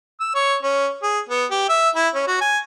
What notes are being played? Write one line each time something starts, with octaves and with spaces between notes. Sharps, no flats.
E6
C#5
C#4
G#4
B3
G4
E5
E4
C#4
F#4
G#5